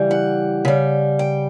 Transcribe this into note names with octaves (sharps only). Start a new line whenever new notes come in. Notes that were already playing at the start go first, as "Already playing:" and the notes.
Already playing: C#3 E3 G3
F#5
C#3 G3
G5